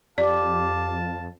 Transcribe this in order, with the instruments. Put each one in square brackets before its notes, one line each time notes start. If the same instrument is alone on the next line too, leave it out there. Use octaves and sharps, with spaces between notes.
[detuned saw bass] F2 [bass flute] G4 [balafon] D5 [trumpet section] F5 A5